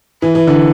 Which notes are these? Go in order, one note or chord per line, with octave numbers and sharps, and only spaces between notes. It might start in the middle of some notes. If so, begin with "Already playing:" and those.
E3
E3
D3